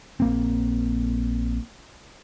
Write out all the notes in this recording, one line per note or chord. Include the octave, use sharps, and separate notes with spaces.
A#1 A#3 C4